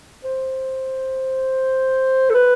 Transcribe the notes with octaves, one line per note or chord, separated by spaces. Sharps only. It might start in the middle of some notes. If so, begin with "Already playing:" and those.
C5
A4
B4